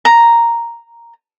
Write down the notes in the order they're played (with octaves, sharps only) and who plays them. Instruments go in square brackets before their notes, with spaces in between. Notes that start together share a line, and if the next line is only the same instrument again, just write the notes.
[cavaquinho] A#5